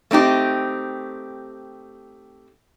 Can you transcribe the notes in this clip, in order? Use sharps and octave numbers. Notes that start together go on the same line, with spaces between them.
A3 C4 D#4 G4